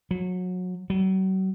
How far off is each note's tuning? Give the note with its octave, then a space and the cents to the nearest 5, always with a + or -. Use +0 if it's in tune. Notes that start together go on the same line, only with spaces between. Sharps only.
F#3 -25
F#3 +40